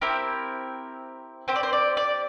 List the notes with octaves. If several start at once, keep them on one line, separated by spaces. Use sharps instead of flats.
C4 E4 G4 A#4
C4 G4 C5
D5
C5
D5
D5